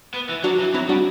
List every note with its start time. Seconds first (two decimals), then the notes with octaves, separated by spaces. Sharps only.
0.14 B3
0.29 E3
0.43 F#3 D4 F#4
0.59 E3
0.74 F#3 C4 E4
0.89 G3 D4 F#4